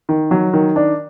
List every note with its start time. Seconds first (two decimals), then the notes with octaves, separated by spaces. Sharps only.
0.09 D#3
0.31 F#3
0.53 D#3
0.76 D4